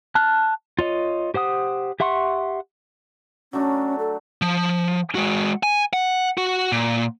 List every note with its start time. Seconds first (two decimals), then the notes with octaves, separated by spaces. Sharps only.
0.15 A5 F6 F#6
0.79 F4 C#5 D#5
1.34 G4 C5 F#5 D#6
2.00 G4 E5 F#5 C6 C#6
3.53 F#3 A3 C#4 D4
3.99 A4
4.42 F3
5.15 G#3 F#4
5.63 G#5
5.93 F#5
6.38 F#4
6.72 A#2